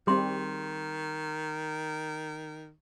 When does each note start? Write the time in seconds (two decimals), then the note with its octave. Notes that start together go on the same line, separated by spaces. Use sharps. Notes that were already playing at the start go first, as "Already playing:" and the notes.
0.07 D#3 G3 C4 G#4 C6